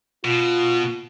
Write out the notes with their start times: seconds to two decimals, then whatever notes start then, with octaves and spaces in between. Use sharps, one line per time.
0.25 B2 F4